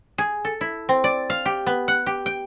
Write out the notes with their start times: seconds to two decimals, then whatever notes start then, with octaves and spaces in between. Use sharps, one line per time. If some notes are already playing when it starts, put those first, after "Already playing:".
0.18 G#4
0.45 A4
0.61 E4
0.89 C4
1.04 D5
1.30 F5
1.45 G4
1.66 B3
1.88 F#5
2.06 G4
2.26 G5